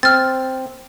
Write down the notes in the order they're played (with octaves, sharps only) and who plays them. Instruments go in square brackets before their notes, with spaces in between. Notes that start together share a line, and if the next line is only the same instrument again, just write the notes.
[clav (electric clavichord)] C4 [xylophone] F6 A6